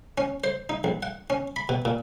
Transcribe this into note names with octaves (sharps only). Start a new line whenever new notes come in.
C#4
C5
D#4
A#1
F#5
C#4
B5
B2
A#2